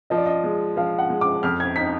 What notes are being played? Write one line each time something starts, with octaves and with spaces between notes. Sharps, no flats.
F3 D#5
D5
D#5
G#3
F3 F5
F#5
G#3
D6
F2 F6
G#6
D#4 B6